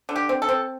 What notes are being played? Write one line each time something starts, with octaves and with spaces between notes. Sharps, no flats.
D3
G4
C4
A4
C4